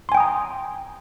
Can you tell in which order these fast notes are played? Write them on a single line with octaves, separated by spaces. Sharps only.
C6 G#5 G5 D#6 A#5